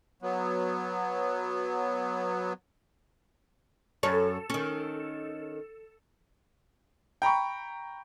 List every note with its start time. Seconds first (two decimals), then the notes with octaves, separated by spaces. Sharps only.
0.22 F#3 B3
4.03 F#2 A4 C#5
4.50 D#3 C#4
7.22 G5 A#5 B5 C#6